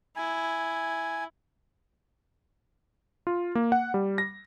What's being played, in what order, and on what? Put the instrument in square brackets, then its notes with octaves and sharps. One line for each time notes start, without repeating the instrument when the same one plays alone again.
[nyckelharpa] E4 [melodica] G#5
[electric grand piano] F4
A#3
F#5
G3
A#6